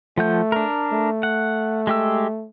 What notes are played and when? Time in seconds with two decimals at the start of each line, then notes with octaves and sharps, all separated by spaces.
0.18 F3 A3 F#5 G6
0.52 D4 A#4
0.92 A3
1.23 F#5
1.87 G#3 G4 E6